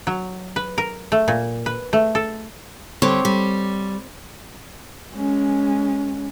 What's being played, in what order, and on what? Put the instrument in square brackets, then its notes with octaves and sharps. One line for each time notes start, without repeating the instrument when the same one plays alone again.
[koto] F#3
B4
A#4
A3
A#2
B4
A3
A4
[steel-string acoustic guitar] D3 G3 [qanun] C4 C#5 D6
[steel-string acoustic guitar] G3
[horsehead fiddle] G#3 C#4